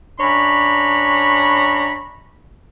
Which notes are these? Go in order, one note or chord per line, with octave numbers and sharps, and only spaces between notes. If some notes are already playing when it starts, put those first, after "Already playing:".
F#2 D4 C#5 A#5 B5